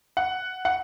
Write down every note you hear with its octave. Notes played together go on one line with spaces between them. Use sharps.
F#5
F#5